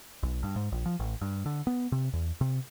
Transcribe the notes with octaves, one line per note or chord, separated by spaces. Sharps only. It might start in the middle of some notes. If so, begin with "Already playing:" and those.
B1
G2
G#2
A#1
F3
A1
G2
D3
B3
C3
E2
C3